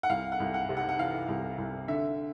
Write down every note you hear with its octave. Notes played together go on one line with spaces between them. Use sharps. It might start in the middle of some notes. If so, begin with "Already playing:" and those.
F#5
C2 F5
F#5
C2
F#5
C3
F#5
F#5
E3 F5
C2
C2
D3 E5